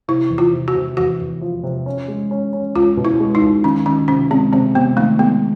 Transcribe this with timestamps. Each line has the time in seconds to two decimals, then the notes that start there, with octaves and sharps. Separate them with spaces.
0.08 C3 E4
0.30 E2
0.38 F4
0.53 C3
0.68 F#4
0.75 C3
0.97 E2 F#4
1.20 E2
1.41 F3
1.64 C3
1.86 C#4
2.08 G#3
2.31 C#4
2.53 C#4
2.76 C#2 F4
2.97 B2
3.05 E4
3.20 G#3
3.35 D#4
3.42 C#2
3.63 D#3 C#4
3.86 D#3 C#4
4.08 C3 C#4
4.30 G#3 C4
4.53 C3 C4
4.75 C3 B3
4.97 D#3 A3
5.19 G#3 B3